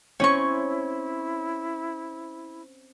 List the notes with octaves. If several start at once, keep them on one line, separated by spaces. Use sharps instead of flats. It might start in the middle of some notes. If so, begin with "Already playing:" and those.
C4 C#4 E4 C#5 C#6